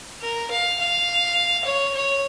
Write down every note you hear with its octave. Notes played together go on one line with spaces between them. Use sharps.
A#4
F5
F5
C#5
C#5